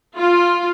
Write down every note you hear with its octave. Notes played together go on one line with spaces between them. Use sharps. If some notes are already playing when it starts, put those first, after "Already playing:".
F4